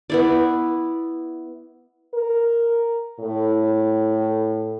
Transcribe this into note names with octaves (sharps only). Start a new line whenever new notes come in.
B3 E4 D5
A#4
A2